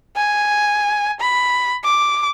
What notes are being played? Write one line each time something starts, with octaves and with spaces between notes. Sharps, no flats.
G#5
B5
D6